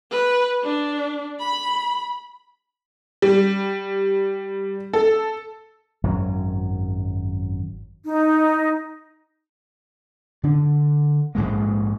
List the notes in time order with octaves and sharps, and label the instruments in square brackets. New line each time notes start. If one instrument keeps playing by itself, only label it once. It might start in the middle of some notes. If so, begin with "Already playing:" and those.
[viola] B4
D4
B5
[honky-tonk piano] G3
A4
[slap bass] G#1 F#2 F#3
[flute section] D#4
[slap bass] D3 D4
A#1 G#2 G#3 A#3